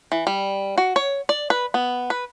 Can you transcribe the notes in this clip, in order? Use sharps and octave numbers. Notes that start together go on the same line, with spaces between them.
E3
G3
F#4
C#5
D5
B4
B3
B4